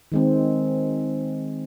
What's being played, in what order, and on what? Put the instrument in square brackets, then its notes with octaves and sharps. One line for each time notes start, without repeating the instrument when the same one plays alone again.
[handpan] D#3 G#3 C4